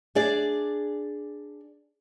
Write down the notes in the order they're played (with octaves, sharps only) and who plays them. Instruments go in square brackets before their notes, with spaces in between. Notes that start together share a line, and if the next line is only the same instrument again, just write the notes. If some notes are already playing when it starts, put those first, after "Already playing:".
[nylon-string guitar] D4 G#4 D5